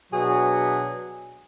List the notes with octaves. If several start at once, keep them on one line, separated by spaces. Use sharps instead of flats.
B2 F#3 D4 F#4 G#4